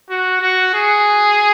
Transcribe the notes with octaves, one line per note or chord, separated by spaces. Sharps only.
F#4
F#4
G#4